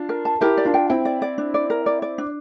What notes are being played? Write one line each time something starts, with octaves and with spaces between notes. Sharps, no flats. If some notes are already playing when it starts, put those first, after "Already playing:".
Already playing: D4 F4
A#4
A5
E4 G4 A#4
D5
D4 F4
G5
C4 E4 G5
D5
D5
D4
D5
A#4
D5
D5
D4